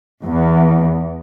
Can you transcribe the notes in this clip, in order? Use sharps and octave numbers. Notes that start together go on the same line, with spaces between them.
E2